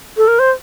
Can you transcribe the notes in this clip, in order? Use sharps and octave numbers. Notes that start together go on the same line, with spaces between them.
A4
A#4
C5